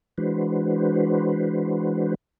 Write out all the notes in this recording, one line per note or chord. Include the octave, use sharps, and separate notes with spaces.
E3 G#3 D4 F#4 B4 C5